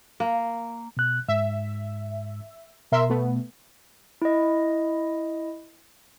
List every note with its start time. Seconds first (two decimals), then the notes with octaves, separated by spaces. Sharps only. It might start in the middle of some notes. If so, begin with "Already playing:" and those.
0.20 A#3
0.97 B2 F#6
1.28 G#2 E5
2.92 B2 A#4 E5 C6
3.10 A3 B3
4.22 E4 D#5